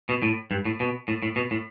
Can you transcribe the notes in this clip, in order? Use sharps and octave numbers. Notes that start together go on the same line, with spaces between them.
B2
A2
G2
A2
B2
A2
A2
B2
A2